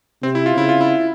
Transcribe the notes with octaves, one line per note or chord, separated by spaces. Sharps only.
C3 C4
E4
F4
C#3 E4
F4
E4